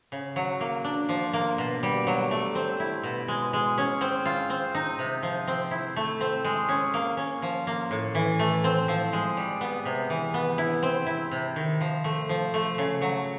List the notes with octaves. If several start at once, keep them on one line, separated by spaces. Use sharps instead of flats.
C#3
F#3
A#3
D4
F3
A#3
B2
G3
F#3
A3
C4
E4
B2
G#3
G#3
C#4
C4
F4
C4
D#4
C3
F3
C4
E4
A3
C4
G#3
C#4
A#3
C#4
F3
A#3
A2
E3
A3
C4
F3
G#3
G3
B3
C3
E3
B3
E4
C4
E4
C3
D#3
F3
A3
F3
A3
C#3
F#3